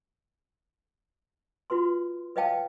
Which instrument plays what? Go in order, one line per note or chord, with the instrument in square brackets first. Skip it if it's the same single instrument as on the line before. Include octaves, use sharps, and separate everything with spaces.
[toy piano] F4 F#4 B4 C6
B4 C#5 D#5 F5 G5 A5